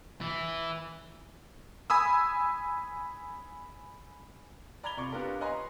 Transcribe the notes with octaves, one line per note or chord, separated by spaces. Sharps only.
E3
G#5 B5 D#6 E6
D5 A#5 B5 G#6 F7 G7
C3 F4 D5 F5 C#6 D6
B3 D4 F4 G4 A#4
B4 C#5 D#5 G#5 A#5 C6